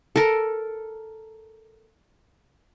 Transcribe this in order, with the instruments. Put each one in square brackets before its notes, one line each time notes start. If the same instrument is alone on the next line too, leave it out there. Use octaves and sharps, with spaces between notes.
[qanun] A4 A#4